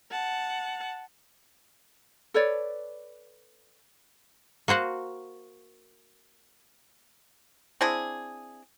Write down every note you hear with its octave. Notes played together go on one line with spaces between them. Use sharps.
F#5 A5
A4 B4 C#5 D5
A#3 F#4 C5 F#5
C4 D4 E4 G#4